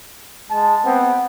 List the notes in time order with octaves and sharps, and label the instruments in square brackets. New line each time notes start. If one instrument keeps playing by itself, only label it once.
[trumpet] G#3 [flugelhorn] A5
[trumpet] B3 [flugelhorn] C4